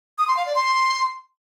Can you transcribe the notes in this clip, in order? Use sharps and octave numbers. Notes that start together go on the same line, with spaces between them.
D#6
C6
F5
D5
C6